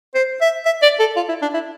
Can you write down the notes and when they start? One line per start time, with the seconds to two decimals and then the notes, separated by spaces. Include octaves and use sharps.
0.15 C5
0.41 E5
0.66 E5
0.82 D5
0.99 A4
1.16 F4
1.29 E4
1.42 D4
1.54 E4